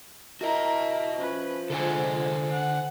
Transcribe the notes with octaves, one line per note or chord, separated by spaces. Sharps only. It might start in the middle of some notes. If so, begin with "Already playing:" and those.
E4 F#4 A#4 D#5 A#5
F3 C#4 B4
D3 G#3 F4 A4 C5 G#5
F#5